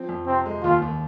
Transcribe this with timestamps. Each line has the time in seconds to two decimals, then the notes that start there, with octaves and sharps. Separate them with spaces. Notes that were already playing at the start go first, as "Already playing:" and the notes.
Already playing: F3 C4
0.09 F2
0.27 C3 C4
0.46 G#3
0.63 D#2 F4
0.82 D#2